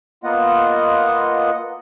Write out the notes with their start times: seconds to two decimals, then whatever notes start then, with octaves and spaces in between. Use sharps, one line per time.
0.24 A#3 B3 F4 D#5 F#5